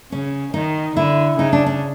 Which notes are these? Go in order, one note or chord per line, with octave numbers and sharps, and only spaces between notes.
C#3 C#4
D#3 D#4
D3 E4
C#3 D#4
D4
D4